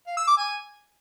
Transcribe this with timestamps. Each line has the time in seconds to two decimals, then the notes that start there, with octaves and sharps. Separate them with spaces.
0.07 F5
0.17 E6
0.27 D6
0.37 G#5